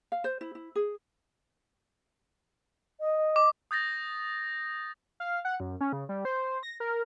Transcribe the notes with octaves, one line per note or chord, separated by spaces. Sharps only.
F5
C5
E4
E4
G#4
D#5
D6
D#6 G6 A6 A#6
F5
F#5
F#2
C#4
C#3
G3
C5
A#6
A#4